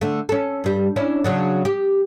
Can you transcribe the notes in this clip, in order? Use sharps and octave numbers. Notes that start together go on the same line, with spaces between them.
D3 A3
C#4 A4
G2 G3
C#4 D4 E4
C#3 F#3 D4
G4